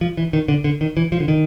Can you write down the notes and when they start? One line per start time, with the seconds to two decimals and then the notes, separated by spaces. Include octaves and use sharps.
0.01 F3
0.17 E3
0.33 D#3
0.48 D3
0.64 D3
0.81 D#3
0.97 E3
1.12 F3
1.20 D3
1.28 D#3